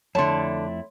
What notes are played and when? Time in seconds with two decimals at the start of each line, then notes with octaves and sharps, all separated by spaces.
0.15 F2 D3 A3 E4 C#5 A5 C6